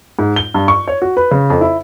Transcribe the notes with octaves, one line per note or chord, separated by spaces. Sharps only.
G#2
G7
G2
C#6
C#5
F#4
B4
C#3
F2
E4